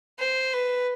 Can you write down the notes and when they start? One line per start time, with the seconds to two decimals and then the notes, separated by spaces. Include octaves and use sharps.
0.19 C5
0.54 B4